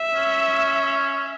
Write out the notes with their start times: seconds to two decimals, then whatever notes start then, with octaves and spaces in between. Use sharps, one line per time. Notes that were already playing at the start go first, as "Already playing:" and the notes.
Already playing: E5
0.14 C#4